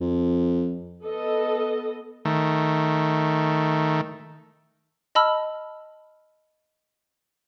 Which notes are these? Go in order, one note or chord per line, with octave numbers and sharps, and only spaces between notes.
F2
B3 A4 D#5
D#3 A3
D#5 A5 B5 E6 F6